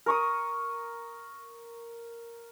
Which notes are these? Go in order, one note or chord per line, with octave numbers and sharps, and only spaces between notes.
A#4 C#6 D#6